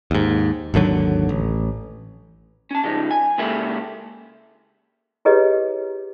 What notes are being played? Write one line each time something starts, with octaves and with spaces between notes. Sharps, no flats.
D#2 G#2
G#1 D#2 D3 F#3
A1
C#4 A5
C#3 F3 G3 G#3 D#4
G#5
C#3 G#3 A#3 E4 G4 A4
E4 G4 G#4 B4 C#5 D#5